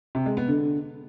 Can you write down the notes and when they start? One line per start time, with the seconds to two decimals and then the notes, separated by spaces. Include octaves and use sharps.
0.15 C3
0.26 G#3
0.37 B3
0.48 D3